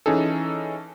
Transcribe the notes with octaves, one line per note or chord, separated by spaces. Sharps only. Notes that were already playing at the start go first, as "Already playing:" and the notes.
E3 C#4 D#4 G#4 A4